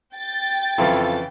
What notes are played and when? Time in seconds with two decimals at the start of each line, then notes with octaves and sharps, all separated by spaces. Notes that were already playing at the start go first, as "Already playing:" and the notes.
0.14 G5 A6
0.78 F2 C#3 E3 E4